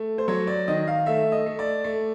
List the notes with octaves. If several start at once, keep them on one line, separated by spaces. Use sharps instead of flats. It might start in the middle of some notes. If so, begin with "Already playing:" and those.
Already playing: A3
C5
F#3 C#5
D5
D#3 D#5
F5
A3 E5
D#5
A3
D5
A3